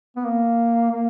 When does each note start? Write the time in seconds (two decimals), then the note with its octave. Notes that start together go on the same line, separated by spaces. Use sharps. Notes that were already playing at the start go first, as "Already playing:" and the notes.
0.16 B3
0.25 A#3
0.91 A#3